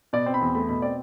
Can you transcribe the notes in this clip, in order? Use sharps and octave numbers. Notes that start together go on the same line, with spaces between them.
B2 D5
C4
B5
E2
A3 B5
B2 B5
C4 D5